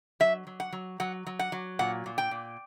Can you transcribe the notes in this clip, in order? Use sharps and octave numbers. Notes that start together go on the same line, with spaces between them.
F#3 E5
F#3
F#5
F#3
F#3 F#5
F#3
F#5
F#3
A#2 F#5
A#2
G5
A#2